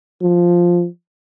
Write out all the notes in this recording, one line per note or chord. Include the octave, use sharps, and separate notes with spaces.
F3